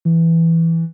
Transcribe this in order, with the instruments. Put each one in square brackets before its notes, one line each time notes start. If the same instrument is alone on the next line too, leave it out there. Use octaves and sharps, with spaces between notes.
[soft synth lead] E3